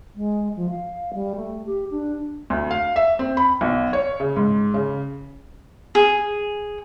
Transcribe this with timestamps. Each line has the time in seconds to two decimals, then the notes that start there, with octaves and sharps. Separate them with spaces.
0.16 G#3
0.56 F3
0.70 F5
1.14 G3
1.36 A3
1.66 G4
1.91 D4
2.50 D2
2.71 F5
2.96 E5
3.19 C4
3.37 B5
3.61 B1
3.93 C#5
4.20 C#3
4.36 G#2
4.74 C#3
5.95 G#4